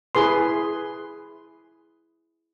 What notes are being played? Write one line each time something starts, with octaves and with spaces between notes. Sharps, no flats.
E4 G#4 B4 C6